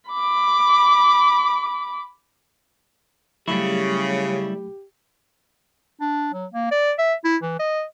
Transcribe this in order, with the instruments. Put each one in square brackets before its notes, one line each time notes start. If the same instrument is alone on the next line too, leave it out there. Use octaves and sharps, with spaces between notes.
[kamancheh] B5 D6
[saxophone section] C#3 [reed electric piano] F#3 A3 B5 [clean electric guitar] G3 E4 [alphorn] G4
[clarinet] D4
F#3
A#3
D5
E5
E4
E3
D#5